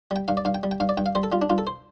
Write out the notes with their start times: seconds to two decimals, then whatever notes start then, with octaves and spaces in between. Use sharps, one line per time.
0.11 G3 G5
0.28 G2 F5
0.37 D5
0.45 G2 F5
0.54 G5
0.63 G3
0.71 G5
0.80 G2 F5
0.89 D5
0.97 G2 G5
1.06 F5
1.15 G3 C5
1.23 A4
1.32 G3 F4
1.42 D4
1.50 G2 F4
1.58 A4
1.67 C5